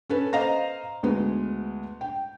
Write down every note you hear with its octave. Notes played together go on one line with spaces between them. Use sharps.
C#4 A4 B4
C5 D#5 F5 A#5 A#6
D2 G#3 B3
G5